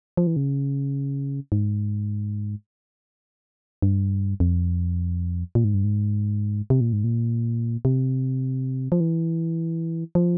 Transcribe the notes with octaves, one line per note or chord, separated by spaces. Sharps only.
F3
E3
C#3
G#2
G2
F2
A#2
G#2
G2
G#2
C3
A#2
G#2
A#2
C3
F3
E3
F3